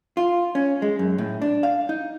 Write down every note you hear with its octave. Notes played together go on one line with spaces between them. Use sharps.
F4
C#4
G#3
F#2
A2
D4
F5
D#4